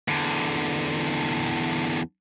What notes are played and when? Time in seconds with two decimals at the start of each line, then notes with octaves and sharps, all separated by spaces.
0.08 E2 D3